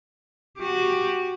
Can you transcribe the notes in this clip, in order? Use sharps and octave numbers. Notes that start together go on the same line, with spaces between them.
F#4 G4